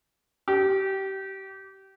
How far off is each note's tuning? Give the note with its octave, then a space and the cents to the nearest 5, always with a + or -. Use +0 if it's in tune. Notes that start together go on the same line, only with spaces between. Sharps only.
G4 -25